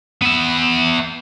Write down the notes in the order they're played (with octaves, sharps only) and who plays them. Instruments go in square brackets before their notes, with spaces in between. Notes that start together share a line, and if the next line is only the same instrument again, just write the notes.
[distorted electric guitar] B3 E5